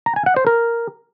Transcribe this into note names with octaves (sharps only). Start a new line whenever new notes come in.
A#5
G#5
F#5
C5
A#4